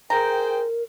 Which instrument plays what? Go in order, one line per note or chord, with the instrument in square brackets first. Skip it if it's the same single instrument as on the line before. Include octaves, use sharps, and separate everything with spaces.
[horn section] G#4 C5 G5 [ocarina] A#4 [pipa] A#5